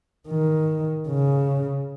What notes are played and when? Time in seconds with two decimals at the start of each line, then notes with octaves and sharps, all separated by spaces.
0.29 D#3
1.08 C#3